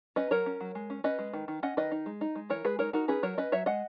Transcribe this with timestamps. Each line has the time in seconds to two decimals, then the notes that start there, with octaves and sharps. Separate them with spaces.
0.16 C#4 B4 D#5
0.31 F#3 A#4 C#5
0.46 C#4
0.61 F#3
0.75 G#3
0.90 C#4
1.04 C#4 B4 D#5
1.19 G#3
1.33 D#3
1.48 D#3
1.63 C#4 D#5 F#5
1.77 D#3 B4 D#5
1.91 D#4
2.06 G#3
2.21 D#4
2.35 G#3
2.49 E3 A#4 C#5
2.65 G#3 G#4 B4
2.79 D#4 A#4 C#5
2.93 D#4 F#4 A#4
3.08 C#4 G#4 B4
3.23 F#3 A#4 C#5
3.38 C#4 B4 D#5
3.52 F#3 C#5 E5
3.66 G#3 D#5 F#5